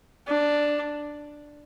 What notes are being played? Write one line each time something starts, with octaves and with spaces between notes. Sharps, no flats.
D4